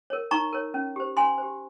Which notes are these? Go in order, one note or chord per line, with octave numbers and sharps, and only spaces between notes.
A#4 C#5
D#4 A#5 C#6
A#4 C#5
C#4
G4 C5
C#4 G#5 C6
G4 C5